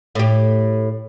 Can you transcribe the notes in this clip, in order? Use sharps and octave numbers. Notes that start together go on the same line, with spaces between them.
A2 G4